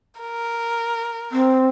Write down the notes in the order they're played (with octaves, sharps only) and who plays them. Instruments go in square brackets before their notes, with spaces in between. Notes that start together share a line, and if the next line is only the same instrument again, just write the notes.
[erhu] A#4
[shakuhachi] C4